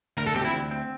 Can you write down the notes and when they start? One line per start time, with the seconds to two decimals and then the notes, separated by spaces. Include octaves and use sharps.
0.18 D2 A#4
0.27 A4
0.36 C4 G4
0.45 E4
0.54 D2
0.71 C4